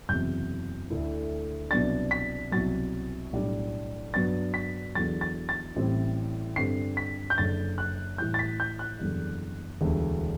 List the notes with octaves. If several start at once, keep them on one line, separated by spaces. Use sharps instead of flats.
F#1 E2 C3 F#3 G6
D2 D3 A3 E4
C2 B2 F#3 B3 D4 A6
B6
C2 B2 F#3 A6
B1 A2 G3 D4
G2 F#3 B3 D4 A6
B6
E2 D3 F#3 A6
A6
A6
A1 A2 G3 C4 E4
G2 D3 G3 C4 C7
B6
G6
F#1 F#2 D3 A6
F#6
A2 E3 G3 G6
A6
B6
G6
F#6
F#1 E2 D3 G3
E1 D2 D3 G3 B3